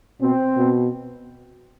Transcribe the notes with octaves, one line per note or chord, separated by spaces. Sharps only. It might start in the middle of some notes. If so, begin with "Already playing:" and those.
B2 C4
B2